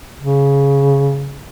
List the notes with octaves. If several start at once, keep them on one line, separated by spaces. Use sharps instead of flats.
C#3